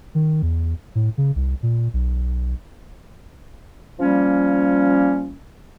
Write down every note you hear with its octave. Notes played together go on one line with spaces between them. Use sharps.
D#3
E2
A2
C#3
C2
A#2
B1
F3 G3 A#3 C#4